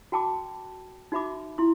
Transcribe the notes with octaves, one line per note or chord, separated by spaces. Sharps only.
F#4 G5 A5 B5 D6
D#4 F#4 E5 B5 D6
E4 F4 C6